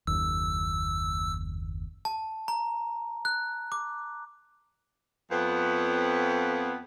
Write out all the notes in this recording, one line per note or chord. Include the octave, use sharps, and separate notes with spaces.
F#1 D#2 E6
A5
A#5
F#6
D6
F2 B3